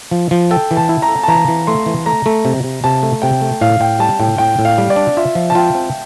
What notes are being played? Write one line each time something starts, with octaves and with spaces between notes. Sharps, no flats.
F3
F3
A4 G5
E3
A5
E4
A#5
A4
A5
E3 A#5
E3
A3 C6
E3
A3 A#5
A3
C3
C3
C3 A5
A3
C3 G5
A3
A2 F5
A2 G5
G3 A5
A2 G5
A2 G5
A2
F5
G3
D5
D4
F4 E5
F3
A5
F4 G5
C4